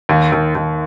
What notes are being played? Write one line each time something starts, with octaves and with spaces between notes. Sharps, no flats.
D#2
D#2
D#2